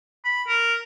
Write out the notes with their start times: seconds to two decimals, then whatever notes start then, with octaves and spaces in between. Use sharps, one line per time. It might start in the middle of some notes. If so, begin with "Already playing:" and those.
0.25 B5
0.48 A#4